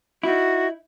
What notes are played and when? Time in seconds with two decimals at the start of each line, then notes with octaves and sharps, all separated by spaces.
0.23 D#4 E4 F#4